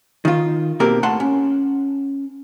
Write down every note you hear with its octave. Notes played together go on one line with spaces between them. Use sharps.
D#3 F4
B2 A#3 C4 G4 A#4
A2 B4 F#5 A5 C6
C#4